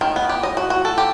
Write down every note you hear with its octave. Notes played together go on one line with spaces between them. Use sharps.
D#3
B3
G4
D#5
F#4
F#4
A4
G4